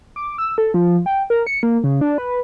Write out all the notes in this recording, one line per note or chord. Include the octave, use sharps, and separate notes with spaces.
D6
E6
A4
F3
G5
A#4
C#7
A#3
C#3
D4
B4